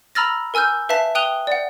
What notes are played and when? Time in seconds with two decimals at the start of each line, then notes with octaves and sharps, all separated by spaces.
0.15 A#5 B5 E6 F6 A6 A#6
0.54 A#4 G#5 E6 F6 G6
0.89 B4 E5 F5 A5 B6
1.15 G5 D#6 F#6 D#7 F7 G7
1.47 D5 F#5